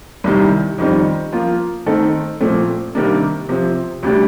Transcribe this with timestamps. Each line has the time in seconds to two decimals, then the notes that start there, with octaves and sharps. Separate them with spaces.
0.24 C2 C3 D#3 G3
0.78 F2 D#3 G3 C4 D#4
1.32 F3 A#3 F4
1.86 D#3 A3 C4 D#4 A4
2.41 A#2 F3 A3 C4
2.95 C3 D#3 G3 A#3 D4
3.49 C3 F3 C4
4.03 D2 C3 G3 D4 G4